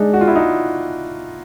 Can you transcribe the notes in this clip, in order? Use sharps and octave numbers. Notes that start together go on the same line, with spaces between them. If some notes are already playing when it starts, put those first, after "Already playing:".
Already playing: G#3 D4 D#4
F#4
F4
E4
D#4